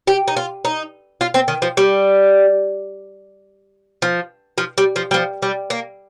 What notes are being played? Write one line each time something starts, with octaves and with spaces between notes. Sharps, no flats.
G4
D#4
F4
D#4
F4
C4
D#3
F3
G3
F3
F3
G3
F3
G3
F3
G3
A#3